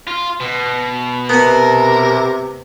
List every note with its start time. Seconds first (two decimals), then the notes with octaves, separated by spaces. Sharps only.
0.07 F4
0.40 B2
1.29 C3 B3 A#4 B4